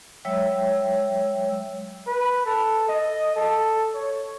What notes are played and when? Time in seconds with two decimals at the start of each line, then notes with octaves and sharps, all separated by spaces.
0.25 F#3 G#3 C#5 E5 G5 E6
2.07 B4
2.46 A4
2.88 D#5
3.36 A4
3.94 C#5